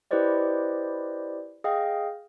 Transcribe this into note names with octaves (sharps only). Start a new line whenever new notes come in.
E4 G4 B4 C5 D5 D#5
G#4 D#5 F5 G5